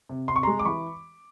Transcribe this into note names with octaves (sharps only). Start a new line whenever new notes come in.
C3
C3 C6
C#6
G#3 A#5 C6
D6
E3 B5 C#6